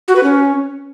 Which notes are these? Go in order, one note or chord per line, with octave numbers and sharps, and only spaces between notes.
F#4
B4
C#4